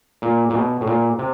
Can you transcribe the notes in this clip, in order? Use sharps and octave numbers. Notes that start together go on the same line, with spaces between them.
A#2
A#2
B2
A2
A#2
C3